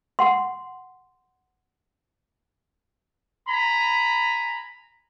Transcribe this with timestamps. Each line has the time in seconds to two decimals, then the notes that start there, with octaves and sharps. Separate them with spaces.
0.19 F#5 C6
3.48 G#5 A#5 B5